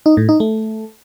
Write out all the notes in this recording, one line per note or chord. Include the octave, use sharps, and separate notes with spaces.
D#4
A2
D#4
A3